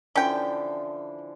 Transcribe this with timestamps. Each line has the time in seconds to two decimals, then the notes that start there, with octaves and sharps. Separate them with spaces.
0.15 D3 E3 F3 C#4 G5